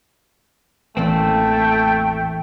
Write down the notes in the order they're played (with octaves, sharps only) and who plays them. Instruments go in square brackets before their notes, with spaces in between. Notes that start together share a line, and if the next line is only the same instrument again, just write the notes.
[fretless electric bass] A1 E3 [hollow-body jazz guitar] E2 A#3 C4 [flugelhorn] A3 [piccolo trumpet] G5